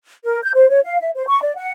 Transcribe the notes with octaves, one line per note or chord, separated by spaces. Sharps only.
A#4
G6
C5
C#5
F5
E5
C5
C#6
D5
F#5